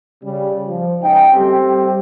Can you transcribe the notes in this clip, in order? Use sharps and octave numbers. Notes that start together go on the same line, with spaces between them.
C#3 G3
F3
C#2 C#4 D#4 G5
G3 A3 C4 G4